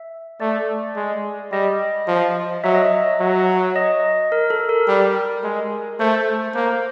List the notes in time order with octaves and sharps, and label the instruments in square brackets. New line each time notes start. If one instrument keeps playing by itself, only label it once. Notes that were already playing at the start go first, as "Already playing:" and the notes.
Already playing: [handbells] E5
[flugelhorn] A3 [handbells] D5
[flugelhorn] G#3
[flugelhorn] G3 [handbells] D#5
[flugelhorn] F3
[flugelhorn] F#3 [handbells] E5
[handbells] D#5
E5
[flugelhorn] F#3
[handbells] D#5
A#4
A4
A#4
[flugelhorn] G3
G#3
[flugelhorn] A3 [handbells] C5
[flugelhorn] A#3 [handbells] C5